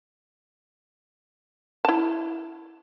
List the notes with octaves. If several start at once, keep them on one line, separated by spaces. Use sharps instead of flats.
E4 A5